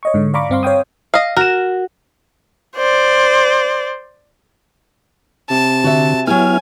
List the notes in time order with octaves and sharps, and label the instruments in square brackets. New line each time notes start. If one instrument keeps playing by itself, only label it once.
[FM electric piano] C#5 D#5 C#6
G#2 D3
D5 F5 A#5 B5 C#6 D6
G2 C4 F5 C6
C#5 F5 G5 D#6
[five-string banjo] D#5 F5
[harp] F#4 E7 [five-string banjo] A#4
[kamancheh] C5 D5
[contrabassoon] C3 [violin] A5
[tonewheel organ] D3 [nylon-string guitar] F#4 E5
[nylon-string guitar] F#3 G4 [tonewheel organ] B3 E4 F6 [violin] G#5